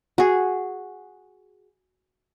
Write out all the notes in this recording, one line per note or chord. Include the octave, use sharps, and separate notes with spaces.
F#4 G#4